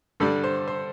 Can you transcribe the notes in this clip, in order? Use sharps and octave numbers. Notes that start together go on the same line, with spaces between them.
G2 D3 G3 D4 A4
C5
C5